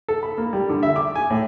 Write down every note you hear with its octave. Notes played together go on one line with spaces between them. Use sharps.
A4
B5
A#3
G3
D3
E5
D6
G#5
A2